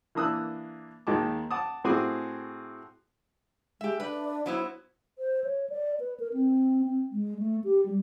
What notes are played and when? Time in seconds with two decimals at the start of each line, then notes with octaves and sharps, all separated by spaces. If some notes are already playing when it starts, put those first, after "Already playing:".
0.15 E3 A#3 D4 D#6 E6 F#6
1.07 D#2 D#3 G#3 A5 D6
1.51 F#5 A5 D6 D#6
1.84 A2 C4 F#4 G#4 G#5 D6
3.81 G#3 G4 E5
4.00 D4 B4
4.46 F#3 B3 E4 C5
5.18 C5
5.44 C#5
5.70 D5
6.00 B4
6.20 A#4
6.33 C4
6.86 C4
7.12 G#3
7.39 A3
7.64 G4
7.86 G3